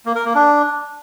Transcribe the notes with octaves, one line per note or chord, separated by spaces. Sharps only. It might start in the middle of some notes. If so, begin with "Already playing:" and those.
A#3
A#4
A#3
D4